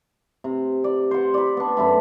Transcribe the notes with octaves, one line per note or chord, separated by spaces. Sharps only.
C3
D5
C5 F#5
D5 B5
B3 D4
F#2 A3 B5